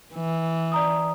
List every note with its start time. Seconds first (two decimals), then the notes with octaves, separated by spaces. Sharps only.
0.14 E3
0.72 D5 A#5 D#6